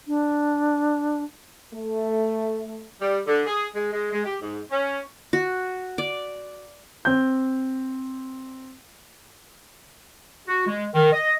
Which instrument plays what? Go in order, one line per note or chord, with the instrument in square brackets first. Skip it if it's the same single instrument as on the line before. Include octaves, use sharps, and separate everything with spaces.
[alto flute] D4
[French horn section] A3
[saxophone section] G3
D3
G#4
G#3
G#3
G#3
G4
G#2
C#4
[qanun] F#4
D5
[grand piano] C4 G6
[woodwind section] F#4
G#3
D#3
D#5